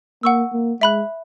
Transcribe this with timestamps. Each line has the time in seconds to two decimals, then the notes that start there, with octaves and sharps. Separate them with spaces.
0.23 A#3 F#5 C#6 E6
0.53 A#3
0.81 G#3 E5 B5 F#6